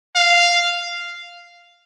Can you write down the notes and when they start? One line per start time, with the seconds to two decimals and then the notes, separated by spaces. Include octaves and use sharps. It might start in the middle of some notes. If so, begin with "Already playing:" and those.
0.16 F5